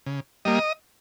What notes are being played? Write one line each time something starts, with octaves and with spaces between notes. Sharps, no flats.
C#3
G3 A#3 D#5